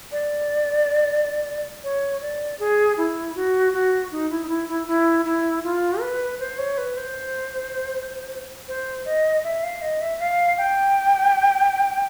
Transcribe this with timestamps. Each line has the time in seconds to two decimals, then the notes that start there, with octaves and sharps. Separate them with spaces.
0.12 D5
1.84 C#5
2.21 D5
2.59 G#4
2.98 E4
3.35 F#4
3.73 F#4
4.12 D#4
4.30 E4
4.44 D#4
4.49 E4
4.69 E4
4.87 E4
5.25 E4
5.64 F4
6.01 B4
6.40 C5
6.58 C#5
6.78 B4
6.97 C5
8.68 C5
9.05 D#5
9.44 E5
9.63 F5
9.82 D#5
10.01 E5
10.20 F5
10.58 G5